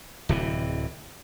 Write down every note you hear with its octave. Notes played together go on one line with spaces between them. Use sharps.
D1 C3 E3